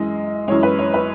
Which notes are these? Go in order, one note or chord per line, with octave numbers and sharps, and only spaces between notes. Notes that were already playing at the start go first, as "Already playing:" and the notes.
Already playing: F#2 E3 G#3 D#5
F#2 E3 G#3 C#5
B4
C#5
B4